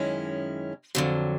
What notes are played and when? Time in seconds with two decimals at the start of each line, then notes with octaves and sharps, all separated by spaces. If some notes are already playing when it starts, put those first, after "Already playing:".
Already playing: F#2 D#3 G#3 C#4 E4
0.95 F2 D3 F#3